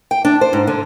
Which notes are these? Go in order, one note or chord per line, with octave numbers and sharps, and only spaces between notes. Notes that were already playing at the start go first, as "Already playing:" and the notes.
G5
D4
C5
G#2
D3